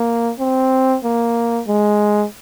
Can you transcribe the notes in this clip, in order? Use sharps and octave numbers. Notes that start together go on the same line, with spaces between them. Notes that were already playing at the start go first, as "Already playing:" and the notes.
Already playing: A#3
C4
A#3
G#3